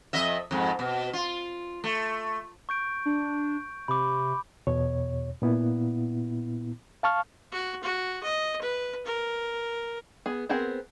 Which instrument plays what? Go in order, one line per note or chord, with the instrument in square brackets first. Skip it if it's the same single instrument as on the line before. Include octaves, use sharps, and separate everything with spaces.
[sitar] F2 D#5 E5
F2 G#2
B2
F4
A3
[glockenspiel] C#6 G6 D7
[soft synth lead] D4
[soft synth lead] C3 [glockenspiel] B5 D6
[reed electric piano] E2 B2 C#5
A#2 B3 E4
F5 A5 C#6 F6
[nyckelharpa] F#4
F#4
D#5
B4
A#4
[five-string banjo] B3 G#4
B3 C4 G#4 A#4 F#5